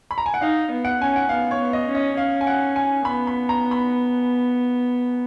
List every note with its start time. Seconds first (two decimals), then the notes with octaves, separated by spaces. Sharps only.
0.11 B5
0.18 A#5
0.26 G#5
0.34 F#5
0.41 D#4 F5
0.70 B3
0.85 F#5
1.00 C#4 G#5
1.16 F#5
1.29 B3 F5
1.51 C#5
1.58 B3
1.73 D#5
1.88 C#4
1.95 D#5
2.17 C#4 F5
2.41 G#5
2.47 F#5
2.76 G#5
3.05 B3 B5
3.27 B5
3.49 A#5
3.71 B5